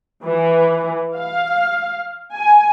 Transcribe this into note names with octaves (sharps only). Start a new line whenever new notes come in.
E3
F5
G#5